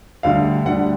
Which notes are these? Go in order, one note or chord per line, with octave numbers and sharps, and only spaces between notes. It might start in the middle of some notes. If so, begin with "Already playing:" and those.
D2 D3 G3 F5
D2 D3 G3 F#5